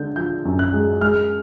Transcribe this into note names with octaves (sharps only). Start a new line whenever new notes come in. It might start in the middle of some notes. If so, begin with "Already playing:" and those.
Already playing: D3 G#3 G6
F3 G6
F#2
F#6
G#3
G#3 F6